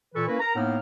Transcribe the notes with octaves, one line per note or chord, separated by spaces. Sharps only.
A#2 E3 A4 B4 C#6
A#3 C#4 E4 A#4 B4
A#4 A#5
A2 A#3 B3 D#4 F6